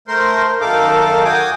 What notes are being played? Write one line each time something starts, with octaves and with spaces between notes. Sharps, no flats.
A3 A#4 C5 C6
F#2 D#3 D#4 A4 F5 D6
F#4 G5 G#5 D6 D#6